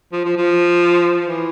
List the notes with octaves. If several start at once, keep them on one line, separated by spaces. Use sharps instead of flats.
F3
F3
F3
E3